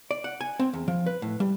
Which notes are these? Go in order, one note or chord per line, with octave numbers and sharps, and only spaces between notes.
D5
F#5
G#5
C4
E2
F3
B4
A2
G3